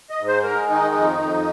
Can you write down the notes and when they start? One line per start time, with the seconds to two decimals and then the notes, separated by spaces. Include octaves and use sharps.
0.10 D#5
0.19 G#2
0.27 C5
0.43 G#3 A#4
0.69 D#3 D#4
0.95 F2
1.19 F2